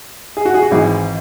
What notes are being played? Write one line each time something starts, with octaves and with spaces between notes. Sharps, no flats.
G#4
F#4
G#4
F#4
G#1 G#2 E3 G#4